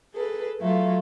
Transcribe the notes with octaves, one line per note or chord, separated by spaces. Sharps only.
G#4 A4 B4
F#3 A3 F4